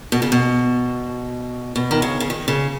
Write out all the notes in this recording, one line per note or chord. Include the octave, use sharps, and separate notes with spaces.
B2
C#3
B2
B2
D#3
C#3
C#3
D#3
C#3